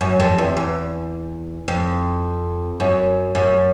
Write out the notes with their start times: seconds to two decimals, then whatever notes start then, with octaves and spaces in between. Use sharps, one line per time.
0.01 F#2
0.20 F2
0.38 E2
0.57 E2
1.68 F2
2.80 F#2
3.35 F#2